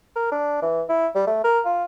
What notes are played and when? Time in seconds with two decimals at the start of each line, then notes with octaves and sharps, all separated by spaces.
0.16 A#4
0.32 D4
0.62 E3
0.89 E4
1.15 G3
1.27 A3
1.44 A#4
1.65 F4